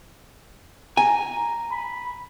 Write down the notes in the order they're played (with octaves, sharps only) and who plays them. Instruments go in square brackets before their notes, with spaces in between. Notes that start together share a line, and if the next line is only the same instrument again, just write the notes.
[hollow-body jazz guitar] G#5 [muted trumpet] A#5
[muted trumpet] B5